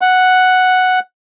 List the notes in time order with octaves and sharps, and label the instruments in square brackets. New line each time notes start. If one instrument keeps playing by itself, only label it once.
[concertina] F#5